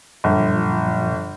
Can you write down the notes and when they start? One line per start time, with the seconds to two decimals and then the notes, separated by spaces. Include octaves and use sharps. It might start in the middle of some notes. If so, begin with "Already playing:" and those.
0.24 G1 F#2 A#2 F3